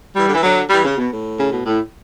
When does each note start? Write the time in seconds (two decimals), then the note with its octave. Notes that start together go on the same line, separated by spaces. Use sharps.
0.15 E3 G3
0.26 D3
0.34 E3
0.42 D3 F#3
0.70 E3 G3
0.84 C#3
0.97 B2
1.11 A2
1.40 C#3
1.53 B2
1.66 A2